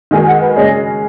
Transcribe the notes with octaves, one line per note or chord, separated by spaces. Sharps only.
D#3 G#3 D#4 F#4 A#4 G#5
F#5
B4
C#3 G#3 C#4 G#4 D#5